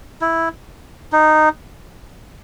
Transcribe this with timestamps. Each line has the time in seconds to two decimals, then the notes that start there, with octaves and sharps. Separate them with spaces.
0.21 E4
1.12 D#4